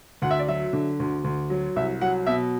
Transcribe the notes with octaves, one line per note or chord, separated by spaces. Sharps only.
D2 F#5
E5
D5
F#3 E5
D3
D2
D2
F#3
C2 E5
F#3 F#5
B2 E5